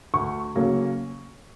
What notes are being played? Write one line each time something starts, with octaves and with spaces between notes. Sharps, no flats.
D2 C#6
C#3 F#3 A#3 C#4